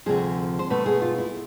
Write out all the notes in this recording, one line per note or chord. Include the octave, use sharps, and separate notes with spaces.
D2 C3 F3 G#4
C5
B2 A3 B4
G#4
F4
E4